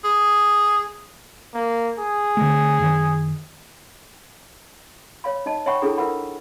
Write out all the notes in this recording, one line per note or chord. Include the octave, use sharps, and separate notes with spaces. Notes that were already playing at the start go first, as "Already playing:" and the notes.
G#4
A#3
G#4
D3 A3
F#2 D#3
C#5 F5 B5
D#4 D#5 A5
C#5 E5 F#5 G5 B5 C#6
D4 E4 G#4 A4 G5 A#5
F4 A#4 B4 E5 F#5 B5